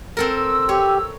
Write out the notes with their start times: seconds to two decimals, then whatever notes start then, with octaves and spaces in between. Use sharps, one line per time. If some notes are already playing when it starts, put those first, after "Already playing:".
0.17 C4 A4 A#4
0.32 E6
0.69 G4 C#5